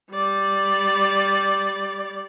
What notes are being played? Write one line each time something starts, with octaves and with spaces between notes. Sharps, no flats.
G3 D5